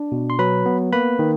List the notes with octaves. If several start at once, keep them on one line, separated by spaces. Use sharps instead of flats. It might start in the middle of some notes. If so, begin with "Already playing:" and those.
Already playing: D4
B2
C6
F#3 B4 B5
B3
A#3 B4 B5
D#3